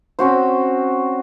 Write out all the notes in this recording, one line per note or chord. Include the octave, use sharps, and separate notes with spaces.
C4 C#4 F#4 C5